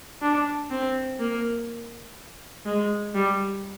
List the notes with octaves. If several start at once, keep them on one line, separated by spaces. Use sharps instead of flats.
D4
C4
A#3
G#3
G3